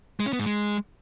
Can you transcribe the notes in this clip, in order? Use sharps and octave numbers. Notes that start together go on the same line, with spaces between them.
G#3
C#4
B3
G#2
G#3